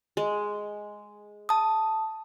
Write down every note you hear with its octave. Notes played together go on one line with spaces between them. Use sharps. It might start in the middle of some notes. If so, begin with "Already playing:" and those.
G#3
A5 D#6